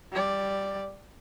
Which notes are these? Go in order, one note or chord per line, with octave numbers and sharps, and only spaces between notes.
G3 D5